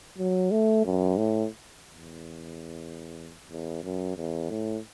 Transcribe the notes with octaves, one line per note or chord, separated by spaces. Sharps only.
F#3
A3
F#2
A2
E2
E2
F#2
E2
A2